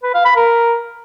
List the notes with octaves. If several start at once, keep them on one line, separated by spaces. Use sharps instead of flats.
B4
F5
B5
A#4